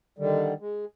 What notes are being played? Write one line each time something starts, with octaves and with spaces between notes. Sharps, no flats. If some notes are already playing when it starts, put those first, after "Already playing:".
D3 D#3 G3
G#3